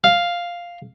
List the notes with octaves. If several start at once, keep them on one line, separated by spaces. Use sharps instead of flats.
F5